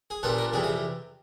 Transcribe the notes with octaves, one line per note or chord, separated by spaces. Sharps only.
G#4
A#2 G3 B3 D4 F4 A4
A#4
F2 C3 E3 G3 G#4
G#4